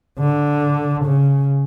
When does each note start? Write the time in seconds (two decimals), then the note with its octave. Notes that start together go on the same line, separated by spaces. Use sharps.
0.19 D3
1.05 C#3